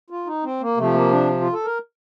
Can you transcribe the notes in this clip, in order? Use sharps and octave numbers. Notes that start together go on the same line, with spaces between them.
F4
D#4
C4
A#3
C3 F3 A3
A#3
D4
F4
A4
A#4